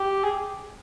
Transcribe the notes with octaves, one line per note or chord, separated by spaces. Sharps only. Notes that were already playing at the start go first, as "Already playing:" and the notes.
Already playing: G4
G#4